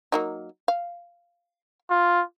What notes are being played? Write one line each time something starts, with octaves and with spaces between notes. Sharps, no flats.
F#3 A#3 D#4
F5
F4